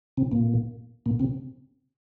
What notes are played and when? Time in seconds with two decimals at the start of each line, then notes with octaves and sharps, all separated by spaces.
0.17 C3 C4
0.32 A#2 A#3
1.06 A#2 A#3
1.20 C3 C4